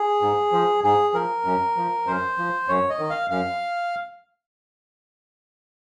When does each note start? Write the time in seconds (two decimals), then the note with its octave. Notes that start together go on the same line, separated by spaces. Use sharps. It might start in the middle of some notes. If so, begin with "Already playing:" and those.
Already playing: G#4
0.21 G#2
0.52 F3
0.83 G#2 G#4
1.14 F3 A#4
1.45 F#2
1.77 F3
2.06 F#2 C5
2.38 F3
2.68 F#2 C#5
2.89 D#5
2.99 D#3
3.10 F5
3.30 F#2 F5